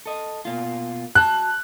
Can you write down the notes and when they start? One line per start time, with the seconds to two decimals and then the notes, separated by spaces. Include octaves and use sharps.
0.06 A4 D#5
0.45 B2 A#3 F4
1.15 F#4 A5 F#6